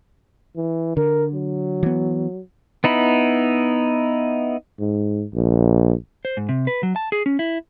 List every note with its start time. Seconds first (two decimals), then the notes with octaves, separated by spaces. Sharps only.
0.56 E3
0.97 D3 A#4
1.34 F#3
1.83 E3 B3
2.84 B3 D#4 E4 B5
4.79 G#2
5.34 A#1
6.25 C5
6.37 G#2
6.49 C3
6.67 B4
6.83 F#3
6.96 A5
7.12 G#4
7.26 C#4
7.39 E4